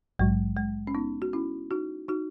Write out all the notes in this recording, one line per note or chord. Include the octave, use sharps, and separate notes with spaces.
A#1 G#2 F#3 G#3
G#3
C#4
B3 D#4
F#4
C#4 E4
D#4 F#4
D#4 F#4